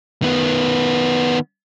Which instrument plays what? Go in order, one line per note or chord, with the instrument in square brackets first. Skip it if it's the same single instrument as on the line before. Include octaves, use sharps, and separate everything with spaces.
[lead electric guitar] D#3 B3